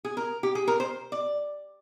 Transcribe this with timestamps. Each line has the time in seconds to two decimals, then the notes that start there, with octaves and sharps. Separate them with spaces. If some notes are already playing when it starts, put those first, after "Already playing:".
0.05 G#4
0.17 A#4
0.43 G4
0.55 G#4
0.68 A#4
0.80 C5
1.12 D5